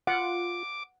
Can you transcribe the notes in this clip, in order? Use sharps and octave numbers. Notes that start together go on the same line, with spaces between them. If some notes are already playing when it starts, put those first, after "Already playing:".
F4 F#5 D6